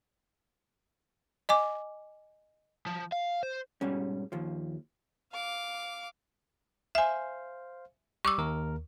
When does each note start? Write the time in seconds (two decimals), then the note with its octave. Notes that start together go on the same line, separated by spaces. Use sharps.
1.49 D#5 G#5 D6
2.86 F3
3.12 F5
3.43 C5
3.81 G#2 B2 G3 C#4
4.32 D#2 F3
5.32 F5 D6
6.95 C5 E5 F5 G#5
8.25 G3 C#6 D6 E6
8.38 D#2 A#4